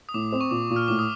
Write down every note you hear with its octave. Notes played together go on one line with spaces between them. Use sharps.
D#6
A2 D6
C4
C#6
A#2 D6
A#2
F6
A2 D6
D#6